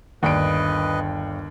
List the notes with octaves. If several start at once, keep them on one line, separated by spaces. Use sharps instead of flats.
G1 D#2 D4 B4 D#5 D7